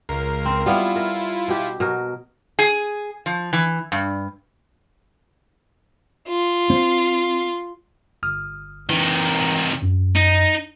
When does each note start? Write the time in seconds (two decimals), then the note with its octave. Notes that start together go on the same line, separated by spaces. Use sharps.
0.09 C#2 A#4 C7
0.45 C4
0.66 G3 B3 E4 F4 F5
0.96 A#4
1.48 B2 G4
1.80 B2 F#3 A#4
2.59 G#4
3.26 F3
3.53 E3
3.92 G2
6.28 F4
6.70 C4
8.23 G1 D#6 F6
8.90 C3 D#3 E3
9.82 F#2
10.16 D#4